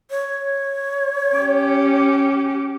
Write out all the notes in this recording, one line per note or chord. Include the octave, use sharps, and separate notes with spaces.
C#5
C#4 G4